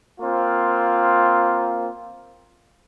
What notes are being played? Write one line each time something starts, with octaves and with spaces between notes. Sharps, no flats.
A#3 C4 F4